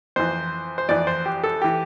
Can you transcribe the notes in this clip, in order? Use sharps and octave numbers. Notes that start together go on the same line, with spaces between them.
F2 E3 C5
C5
F2 E3 D5
C5
G4
A4
E3 G4